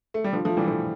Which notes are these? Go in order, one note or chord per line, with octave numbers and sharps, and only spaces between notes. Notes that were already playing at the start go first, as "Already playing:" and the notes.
A3
G3
D3 F3
F3 A3
E3 G3
F3 A3